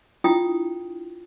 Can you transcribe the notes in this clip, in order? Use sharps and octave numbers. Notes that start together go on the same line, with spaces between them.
D4 E4 F4 G5 D#6